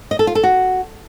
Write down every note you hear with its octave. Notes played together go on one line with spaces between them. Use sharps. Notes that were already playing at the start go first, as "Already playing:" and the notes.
D#5
A4
F4
A4
F#4